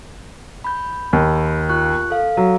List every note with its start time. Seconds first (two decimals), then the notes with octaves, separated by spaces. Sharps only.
0.64 B5 G6
1.13 D#2
1.69 F4 C#6 F#6
2.10 A4 F5
2.37 F#3